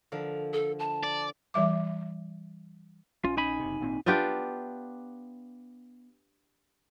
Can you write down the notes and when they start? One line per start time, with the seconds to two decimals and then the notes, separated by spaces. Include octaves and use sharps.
0.12 D3 F3 A#4
0.53 A4
0.79 A5
1.03 D5
1.54 E3 G3 E5 D6
3.25 A#1 C#4 F4
3.37 D#4 G#5 B5
3.60 F#1 C3
3.80 G#1 A#2 C4
4.06 B3 D4 F4 G4